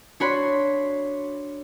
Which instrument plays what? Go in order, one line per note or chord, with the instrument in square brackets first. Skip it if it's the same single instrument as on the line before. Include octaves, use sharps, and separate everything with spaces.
[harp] D4 F#4 C#5 B5 C6